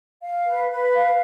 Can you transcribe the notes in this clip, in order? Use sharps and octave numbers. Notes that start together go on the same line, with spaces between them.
F5
B4
B4
F5